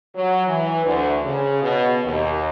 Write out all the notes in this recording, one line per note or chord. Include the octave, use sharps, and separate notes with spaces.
F#3
E3
D2
C#3
B2
D#2